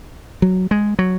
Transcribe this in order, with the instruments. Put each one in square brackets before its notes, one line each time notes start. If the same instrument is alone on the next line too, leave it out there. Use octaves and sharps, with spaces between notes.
[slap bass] F#3
G#3
F#3